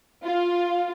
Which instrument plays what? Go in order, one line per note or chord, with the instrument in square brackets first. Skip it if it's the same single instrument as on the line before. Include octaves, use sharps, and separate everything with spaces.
[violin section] F4